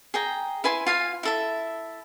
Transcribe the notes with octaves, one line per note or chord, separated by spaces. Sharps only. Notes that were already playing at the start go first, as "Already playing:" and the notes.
G#4 G5 A#5
E4 B4 G#5 C6
F4 F5 G#5
E4 A4 E5